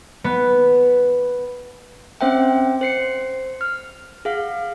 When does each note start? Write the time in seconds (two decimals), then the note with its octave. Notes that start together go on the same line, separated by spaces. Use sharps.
0.24 B3
2.21 C4 C#4 C5 E5 F#5 G5
2.81 C5 C7 C#7
3.61 F6
4.25 G#4 F5 F#5